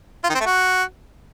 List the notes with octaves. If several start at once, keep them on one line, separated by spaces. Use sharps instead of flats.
F4
D#3
C4
A3
F#4